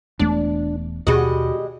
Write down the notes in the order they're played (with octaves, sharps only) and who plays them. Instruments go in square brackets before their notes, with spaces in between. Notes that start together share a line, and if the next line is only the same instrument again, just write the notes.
[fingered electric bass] E1 E2 A3 [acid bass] D4
[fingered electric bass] D#2 B2 [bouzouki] G3 G#3 D#5 [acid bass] F#4